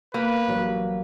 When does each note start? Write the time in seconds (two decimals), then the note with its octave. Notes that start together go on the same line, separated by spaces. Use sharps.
0.14 A#3 B4
0.48 A1 F#3 G3